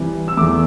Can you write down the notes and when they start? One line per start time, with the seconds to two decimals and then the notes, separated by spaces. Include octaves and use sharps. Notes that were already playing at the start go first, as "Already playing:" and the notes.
Already playing: C3 E3 G3
0.28 E6
0.37 E2 E3 A3 D6